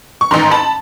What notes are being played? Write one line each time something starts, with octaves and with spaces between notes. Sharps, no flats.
C#6
A1 G#2 D#3 A#5 C6
A5 B5